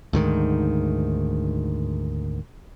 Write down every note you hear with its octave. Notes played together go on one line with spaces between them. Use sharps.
D2 G#2 D#3